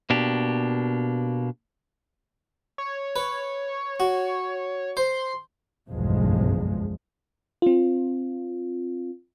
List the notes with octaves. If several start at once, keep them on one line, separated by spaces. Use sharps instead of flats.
B2 A#3 D4 G4
C#5
B4
F#4
C5 C6
F#1 B1 E2 G2 F3 G#3
C4 F4